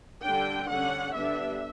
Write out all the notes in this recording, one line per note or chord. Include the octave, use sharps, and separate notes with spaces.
D3 G3 D4 G5
D3 G3 C#4 F#5
D3 G3 B3 D4 E5